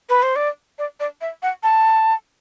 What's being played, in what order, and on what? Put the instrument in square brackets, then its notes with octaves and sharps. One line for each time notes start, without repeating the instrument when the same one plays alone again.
[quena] B4
C5
D5
D5
D5
E5
F#5
A5